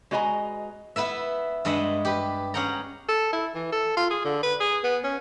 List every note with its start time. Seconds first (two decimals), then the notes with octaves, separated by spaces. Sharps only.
0.11 G#3 F#4 B4 D#5 G#5 A#5
0.96 B3 E4 B4 E5
1.65 G2 G#3 D#5 E5 F#5
2.05 G4 B4
2.54 C#4 G#4 F#5 G5 A#5
3.08 A4
3.33 E4
3.55 E3
3.72 A4
3.97 F4
4.10 G#4
4.25 D3
4.43 B4
4.60 G#4
4.84 B3
5.04 C#4